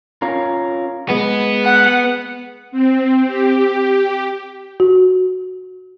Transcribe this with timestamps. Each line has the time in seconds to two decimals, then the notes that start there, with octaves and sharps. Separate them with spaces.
0.22 C#4 F4 A#4
1.10 G#3 B3
1.65 F#5
2.72 C4
3.27 G4
4.80 F#4